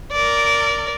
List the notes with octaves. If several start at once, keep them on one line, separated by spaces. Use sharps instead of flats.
A#4 D5